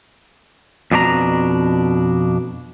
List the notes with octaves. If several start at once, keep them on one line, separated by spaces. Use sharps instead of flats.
F2 B2 D4 F4 A#5